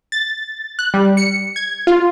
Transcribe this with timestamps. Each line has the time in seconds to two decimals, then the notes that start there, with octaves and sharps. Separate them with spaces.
0.12 A6
0.79 F#6
0.94 G3
1.17 C#7
1.56 G#6
1.87 F4